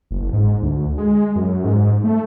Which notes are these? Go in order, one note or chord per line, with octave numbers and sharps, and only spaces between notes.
F#1
G#2
D2
G#3
F#2
G#2
A3